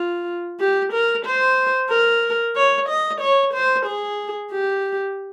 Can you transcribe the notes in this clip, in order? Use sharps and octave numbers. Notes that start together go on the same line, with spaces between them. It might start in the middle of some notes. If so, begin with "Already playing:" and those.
Already playing: F4
G4
A#4
C5
A#4
C#5
D#5
C#5
C5
G#4
G4